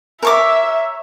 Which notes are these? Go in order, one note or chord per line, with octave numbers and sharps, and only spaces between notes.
A#4 C#5 E5 D6